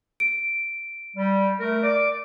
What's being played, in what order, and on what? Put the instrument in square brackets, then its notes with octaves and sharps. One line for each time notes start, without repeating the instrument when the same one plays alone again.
[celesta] D7
[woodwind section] G3
A3 A#4
D5 D6